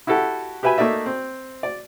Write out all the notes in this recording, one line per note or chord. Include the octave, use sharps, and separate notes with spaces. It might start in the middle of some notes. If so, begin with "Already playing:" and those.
E4 F#4 G4 A4
G4 B4 E5 G#5 B5
A3 A#3 D#4 D5 E5
C4
D5